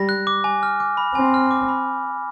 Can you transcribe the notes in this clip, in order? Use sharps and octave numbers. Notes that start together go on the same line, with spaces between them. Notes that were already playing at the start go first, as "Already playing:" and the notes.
Already playing: G3 A#6
F#6
D6
G#5
F6
D6
B5
C4 G#5
F6
D6
B5